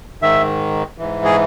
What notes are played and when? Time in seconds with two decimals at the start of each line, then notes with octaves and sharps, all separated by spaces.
0.22 G#2 D#3 E5
0.98 G#2 E3
1.25 G#4